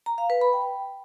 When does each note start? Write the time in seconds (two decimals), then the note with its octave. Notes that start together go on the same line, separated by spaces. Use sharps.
0.06 A#5
0.18 F5
0.30 B4
0.41 B5
0.53 G5